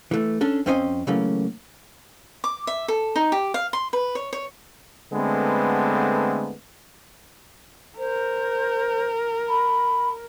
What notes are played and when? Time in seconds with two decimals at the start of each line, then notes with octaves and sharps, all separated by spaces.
0.11 E3 A3
0.41 C#4 D4 A4
0.66 F2 C4 C#4 C5 D#5 G#5
1.07 C#3 E3 F#3 A3 A#3 C#4
2.44 D6
2.67 E5
2.88 A4
3.16 D#4
3.32 G4
3.54 F5
3.73 C6
3.93 B4
4.15 C#5
4.33 C#5
5.13 D3 G#3 A3 B3 C4 B4
7.98 A#4 C5
9.49 B5